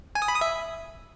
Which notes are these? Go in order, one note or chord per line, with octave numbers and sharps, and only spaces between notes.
G#5
D#6
B5
D#6
E5